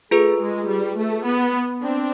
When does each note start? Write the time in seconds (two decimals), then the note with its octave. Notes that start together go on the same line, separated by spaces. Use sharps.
0.11 A3 F4 G#4 B4
0.40 G#3
0.68 G3
0.97 A3
1.25 B3
1.82 C4 D4